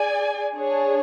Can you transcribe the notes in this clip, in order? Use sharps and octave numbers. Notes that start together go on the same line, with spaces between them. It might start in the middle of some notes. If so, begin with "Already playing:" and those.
Already playing: G#4 D5 G#5
D4 G#4 C#5